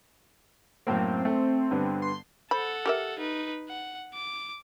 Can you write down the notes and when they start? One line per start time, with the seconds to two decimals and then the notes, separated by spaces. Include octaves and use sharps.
0.87 F#2 A2 A#3 C4
1.25 A3
1.71 G2 D3 B3
2.02 C6
2.51 A4 C5 F#5 B5
2.86 G4 A#4 E5
3.19 D#4 B4
3.69 F#5
4.14 D6